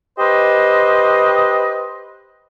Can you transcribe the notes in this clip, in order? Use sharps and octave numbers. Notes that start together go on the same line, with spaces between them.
G4 B4 C5 D#5